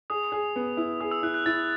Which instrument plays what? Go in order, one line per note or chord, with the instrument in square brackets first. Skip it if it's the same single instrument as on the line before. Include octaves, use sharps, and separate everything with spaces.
[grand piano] G#4 [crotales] D#6
[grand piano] G#4
B3
E4
[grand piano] G#4 [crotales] D#6
[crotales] E6
[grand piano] E4 [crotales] F#6
[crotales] F#6
[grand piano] E4 [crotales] A6